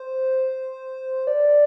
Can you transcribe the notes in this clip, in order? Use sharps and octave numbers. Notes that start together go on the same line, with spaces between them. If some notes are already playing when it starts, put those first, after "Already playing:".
Already playing: C5
D5